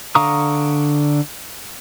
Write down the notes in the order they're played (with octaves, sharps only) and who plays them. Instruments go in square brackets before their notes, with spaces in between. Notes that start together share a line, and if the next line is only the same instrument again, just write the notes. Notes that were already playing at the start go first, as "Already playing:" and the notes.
[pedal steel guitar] D3 F5 A#5 C#6 D#6